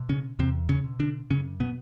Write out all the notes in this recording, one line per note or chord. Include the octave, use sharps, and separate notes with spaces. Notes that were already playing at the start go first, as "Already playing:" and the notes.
Already playing: B2
C#3 C#4
E2 C3 C4
C#3 C#4
B2
D3 D4
F#2 C#3 C#4
B2 B3